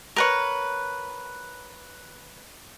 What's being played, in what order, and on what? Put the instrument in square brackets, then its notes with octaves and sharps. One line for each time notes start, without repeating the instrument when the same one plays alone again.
[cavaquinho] A#4 B4 C#5